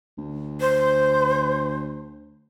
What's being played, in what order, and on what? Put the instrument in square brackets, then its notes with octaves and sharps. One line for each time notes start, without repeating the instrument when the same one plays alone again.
[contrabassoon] D2
[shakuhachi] C5